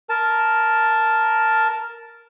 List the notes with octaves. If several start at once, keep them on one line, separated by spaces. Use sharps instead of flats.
A#4 A5